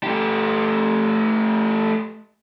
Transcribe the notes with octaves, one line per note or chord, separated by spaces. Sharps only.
A3 G4